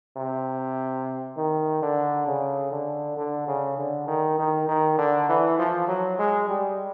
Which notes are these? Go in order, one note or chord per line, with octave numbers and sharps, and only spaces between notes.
C3
D#3
D3
C#3
D3
D3
C#3
D3
D#3
D#3
D#3
D3
E3
F3
F#3
G#3
G3